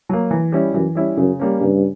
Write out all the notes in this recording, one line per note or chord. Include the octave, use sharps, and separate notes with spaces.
F#3 A#3
E3
G3 C#4 E4
F#2 E3
G3 C#4 E4
F#2 C#3
G3 A#3 C#4
G2 C#3